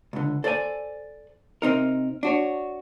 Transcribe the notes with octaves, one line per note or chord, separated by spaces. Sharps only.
C#2 D3
A4 C5 D5 F5 G#5
C3 C4 D#4 A#4
D4 F#4 C#5